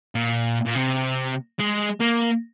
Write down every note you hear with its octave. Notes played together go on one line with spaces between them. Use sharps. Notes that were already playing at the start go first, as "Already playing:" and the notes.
A#2
A#2
C3
G#3
A#3